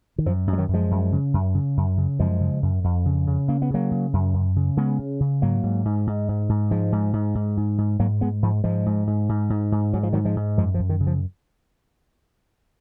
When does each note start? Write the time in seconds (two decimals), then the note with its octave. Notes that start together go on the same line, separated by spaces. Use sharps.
0.18 D#3
0.26 F#2 F3
0.47 F#2
0.53 G#3
0.58 D#3 F#3
0.68 F#2
0.74 F3 G#3
0.91 F#2
1.12 C#3
1.34 F#2
1.54 C#3
1.77 F#2
1.97 C#3
2.19 F#2 F3 G#3
2.40 C#3
2.62 F#2
2.84 F2
3.05 C#3
3.27 C#3
3.48 C#3 A#3
3.62 B3
3.70 C#3 F#3 A#3
3.91 C#3
4.13 F#2
4.34 F#2
4.56 C#3
4.77 C#3 G#3 B3
4.99 C#3
5.20 C#3
5.42 G#2 F#3 A#3
5.63 G#2
5.85 G#2
6.07 G#2
6.28 G#2
6.49 G#2
6.70 G#2 F3 G#3
6.92 G#2
7.13 G#2
7.35 G#2
7.57 G#2
7.78 G#2
7.99 G#2 F#3 A#3
8.21 G#2 G#3 B3
8.42 G#2 F3
8.64 G#2 F3 G#3
8.86 G#2
9.07 G#2
9.29 G#2
9.50 G#2
9.72 G#2
9.93 G#2 F#3
10.03 F3
10.13 G#2 D#3 F#3
10.25 F3 G#3
10.36 G#2
10.57 F#2 F3 G#3
10.74 F3
10.79 F#2
10.89 D#3
11.00 C#3
11.07 F3